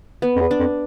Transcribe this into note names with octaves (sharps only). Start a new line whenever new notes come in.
B3
F2
E2
D4
F2